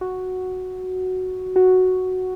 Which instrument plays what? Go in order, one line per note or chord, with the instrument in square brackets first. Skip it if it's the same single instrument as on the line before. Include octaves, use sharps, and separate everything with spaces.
[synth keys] F#4
F#4